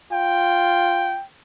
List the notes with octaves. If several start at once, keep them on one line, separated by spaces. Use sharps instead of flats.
F4 G5